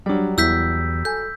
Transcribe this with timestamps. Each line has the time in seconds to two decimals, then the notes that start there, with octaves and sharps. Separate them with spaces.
0.06 F#3 G3 D4 G4
0.38 E2 E4 E6 G6 B6
1.05 A4 G#5 G6